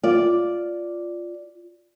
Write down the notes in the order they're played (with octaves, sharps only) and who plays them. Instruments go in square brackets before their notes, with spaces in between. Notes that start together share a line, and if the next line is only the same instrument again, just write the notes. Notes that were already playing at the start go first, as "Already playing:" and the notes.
[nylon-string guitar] F4 D5